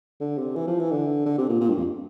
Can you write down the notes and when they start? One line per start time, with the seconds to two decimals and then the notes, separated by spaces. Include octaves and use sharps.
0.21 D3
0.38 C3
0.56 E3
0.67 F3
0.80 E3
0.91 D3
1.25 D3
1.38 C3
1.49 A#2
1.61 A#2
1.69 G2
1.78 F2